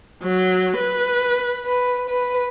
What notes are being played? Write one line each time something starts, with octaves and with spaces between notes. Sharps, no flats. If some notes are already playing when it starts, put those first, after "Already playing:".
F#3
B4
B4
B4